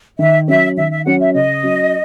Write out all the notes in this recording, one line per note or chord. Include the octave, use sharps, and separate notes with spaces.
D#3 E5
F#3 C#4 E5
D#3 E5
E5
F#3 C#4 F#5
E5
C#3 D#5
F#3 C#4